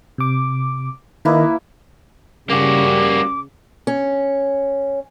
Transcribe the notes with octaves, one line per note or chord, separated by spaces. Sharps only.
C3 D6
D#3 A#3 E4 A#4 B4 D#5
C#3 G3 A#3 F#4 D6
C#4